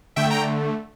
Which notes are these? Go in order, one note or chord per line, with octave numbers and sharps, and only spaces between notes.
D3 A3 E5 G5
G5 A#5